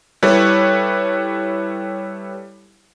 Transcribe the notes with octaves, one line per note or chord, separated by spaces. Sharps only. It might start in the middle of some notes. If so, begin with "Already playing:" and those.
G3 E4 A4 B4 C#5